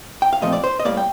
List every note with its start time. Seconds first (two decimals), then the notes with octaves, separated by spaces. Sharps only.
0.22 G5
0.33 F5
0.41 A#2 F3 A3 C4 D#5
0.53 D5
0.64 C5
0.80 D#5
0.85 A2 G3 A#3 D5
0.97 G5